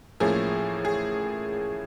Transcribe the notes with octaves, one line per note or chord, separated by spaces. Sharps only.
A2 F3 A#3 C#4 G#4
G#4